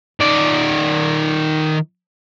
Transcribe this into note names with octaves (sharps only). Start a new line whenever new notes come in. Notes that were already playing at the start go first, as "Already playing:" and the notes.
D#3 D5